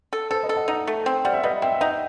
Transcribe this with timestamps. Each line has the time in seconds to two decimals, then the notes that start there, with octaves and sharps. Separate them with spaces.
0.13 A4
0.31 A4 C5
0.43 B4 D#5
0.49 A4
0.56 D#5 F#5
0.68 D#4 D#5 F#5
0.87 A3
1.06 C4
1.25 G3 F#5
1.33 E5
1.43 G3 B4 D#5
1.62 C4 E5 G5
1.74 E5
1.81 D#4 D#5 F#5